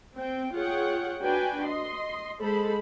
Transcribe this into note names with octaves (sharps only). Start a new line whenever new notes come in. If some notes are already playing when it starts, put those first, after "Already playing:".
C4 G5
F4 G#4 C#5 F#5 G5
D4 F#4 B4 G5 G#5
D#5 C6
G#3 A4 C5 B5